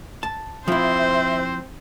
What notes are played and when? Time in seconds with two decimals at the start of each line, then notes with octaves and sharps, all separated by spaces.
0.23 A5
0.68 F3 C4 E4 C5 E5